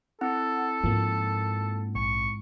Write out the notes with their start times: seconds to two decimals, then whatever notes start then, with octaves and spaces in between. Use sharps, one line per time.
0.21 C4 E4 A4 F#5
0.84 G#2 F3 A#3
1.95 A#1 C#6